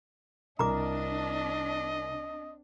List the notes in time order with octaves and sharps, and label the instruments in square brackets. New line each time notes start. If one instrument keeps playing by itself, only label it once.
[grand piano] C2 A#4 [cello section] C4 D4 [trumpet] D#5 [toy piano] A#5 D6